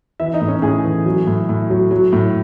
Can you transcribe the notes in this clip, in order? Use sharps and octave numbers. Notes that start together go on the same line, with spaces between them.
E3 E4 E5
D#4 D#5
A2
C#4 C#5
A2 G#4 G#5
E3
F#3
A2
A2
F#3
F#3
A2